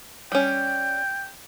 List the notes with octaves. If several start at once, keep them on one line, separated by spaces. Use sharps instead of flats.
G3 C#4 G5